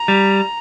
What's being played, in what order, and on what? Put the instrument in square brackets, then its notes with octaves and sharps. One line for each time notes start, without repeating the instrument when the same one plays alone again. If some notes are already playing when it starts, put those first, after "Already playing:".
Already playing: [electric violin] A#5
[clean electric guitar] G3